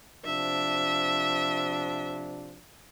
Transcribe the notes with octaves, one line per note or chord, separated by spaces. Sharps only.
C3 F3 D4 E5